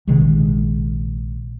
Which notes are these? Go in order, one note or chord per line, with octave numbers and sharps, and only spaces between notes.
A#1 C3 D#3 G#3